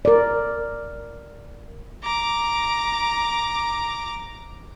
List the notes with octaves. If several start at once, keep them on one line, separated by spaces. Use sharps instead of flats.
A#4 D5
A#5 D6